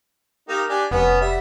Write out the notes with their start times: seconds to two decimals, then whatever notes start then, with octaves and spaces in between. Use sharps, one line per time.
0.49 A#3 D#4 G4
0.69 D4 G4 G#5
0.91 F1 B3 C#4
1.21 G3 E5 F#5